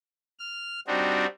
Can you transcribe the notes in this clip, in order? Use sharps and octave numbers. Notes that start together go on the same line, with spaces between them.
F6
G3 C4 D4 D#4 F#4